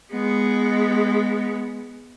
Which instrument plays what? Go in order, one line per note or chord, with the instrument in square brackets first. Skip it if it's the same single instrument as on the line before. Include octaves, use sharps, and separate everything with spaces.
[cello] G#3 B3